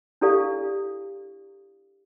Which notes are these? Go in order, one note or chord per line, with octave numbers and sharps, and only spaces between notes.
D4 E4 G4 A4 D5 F5